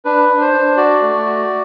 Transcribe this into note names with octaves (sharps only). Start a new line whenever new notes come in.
D4 B4
D4
C5
D4
F#4 D5
A3
F#4